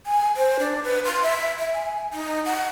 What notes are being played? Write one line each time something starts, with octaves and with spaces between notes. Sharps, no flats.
G#5
C5
D4
B4
C6
E5
E5
G#5
D#4
F#5